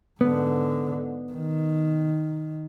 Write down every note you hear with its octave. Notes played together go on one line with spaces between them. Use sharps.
G#2 D3 B3
D#3